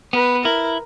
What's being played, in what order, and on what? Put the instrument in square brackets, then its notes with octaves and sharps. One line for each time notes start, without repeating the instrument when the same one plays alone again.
[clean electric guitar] B3 [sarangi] B4
[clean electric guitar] E4 [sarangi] A#4